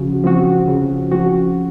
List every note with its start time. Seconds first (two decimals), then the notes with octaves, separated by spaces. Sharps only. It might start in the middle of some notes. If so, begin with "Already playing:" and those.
Already playing: C#3 F3 F#4
0.24 F3 C4 F#4
0.68 C#3
1.11 F3 C4 F#4